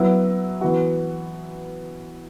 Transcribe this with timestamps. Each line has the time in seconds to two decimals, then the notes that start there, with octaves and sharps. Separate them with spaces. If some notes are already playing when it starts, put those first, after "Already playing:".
Already playing: F#3 B3 E4
0.61 E3 B3 F#4